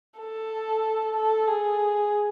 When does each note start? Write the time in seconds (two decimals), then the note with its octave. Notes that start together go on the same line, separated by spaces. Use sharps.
0.19 A4
1.16 A4
1.48 G#4